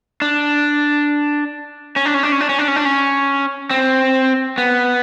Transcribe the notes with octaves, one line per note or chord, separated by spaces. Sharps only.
D4
C#4
D4
C#4
D4
C#4
D4
C#4
D4
C#4
D4
C#4
C4
B3